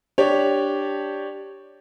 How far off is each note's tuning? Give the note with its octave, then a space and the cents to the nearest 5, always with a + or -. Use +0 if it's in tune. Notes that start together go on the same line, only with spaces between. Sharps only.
D4 +0 G4 +0 C#5 +0